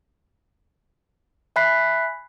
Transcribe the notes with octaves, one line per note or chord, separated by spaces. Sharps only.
E5 G#5 B5 F#6 B6 C7